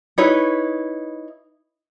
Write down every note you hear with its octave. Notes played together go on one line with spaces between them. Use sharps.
D#4 E4 B4 C#5